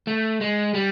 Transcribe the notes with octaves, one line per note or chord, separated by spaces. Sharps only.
A3
G#3
G3